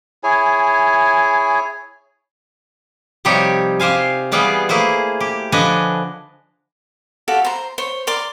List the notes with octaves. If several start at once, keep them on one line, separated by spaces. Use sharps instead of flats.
E4 G#4 C#5 G#5
C3 F3 G3 D#4 G4 C#5
F4 G4 C5 F5 G#5
E3 G3 B3 G#4 F5 G5
A3 A#3 E4 G#4 C5
G4
D3 F3 D4 B4 D#5 G#5
F#4 G4 A4 F5
C5 A#5
C5 C#5
A#4 D5 C6 D6